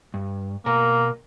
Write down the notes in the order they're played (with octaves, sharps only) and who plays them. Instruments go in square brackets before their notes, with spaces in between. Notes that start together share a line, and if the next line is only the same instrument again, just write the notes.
[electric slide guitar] G2
[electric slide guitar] B2 A#4 [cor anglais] A#3